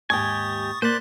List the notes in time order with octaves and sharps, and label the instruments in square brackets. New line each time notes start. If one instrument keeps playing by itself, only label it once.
[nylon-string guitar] D#2 G#2 G5 [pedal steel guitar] G4 G#5 [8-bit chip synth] C#6 D#6 A6
[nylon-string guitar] A#3 [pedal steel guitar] C5 D5 [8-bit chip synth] C6 F#6 B6